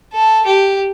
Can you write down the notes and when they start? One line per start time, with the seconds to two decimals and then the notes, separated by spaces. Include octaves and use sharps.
0.13 A4
0.46 G4